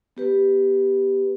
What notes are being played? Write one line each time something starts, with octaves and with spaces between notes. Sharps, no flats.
B3 G4 B4